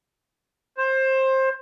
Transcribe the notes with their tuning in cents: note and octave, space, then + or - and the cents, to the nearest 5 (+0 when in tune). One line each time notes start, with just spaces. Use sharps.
C5 +20